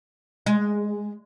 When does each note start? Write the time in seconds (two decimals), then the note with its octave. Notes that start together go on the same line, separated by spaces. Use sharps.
0.46 G#3